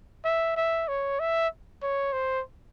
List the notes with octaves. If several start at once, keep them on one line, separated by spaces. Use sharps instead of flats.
E5
E5
C#5
E5
C#5
C5